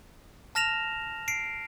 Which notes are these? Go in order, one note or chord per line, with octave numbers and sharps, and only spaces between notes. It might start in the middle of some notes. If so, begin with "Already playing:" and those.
A5 F6 A#6 E7 F7
C7 D7